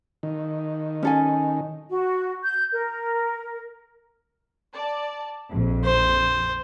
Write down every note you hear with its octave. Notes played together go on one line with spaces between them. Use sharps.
D#3
C#4 A4 G#5
F#4
G6
A#4
D5 A5
A#1 F2
C5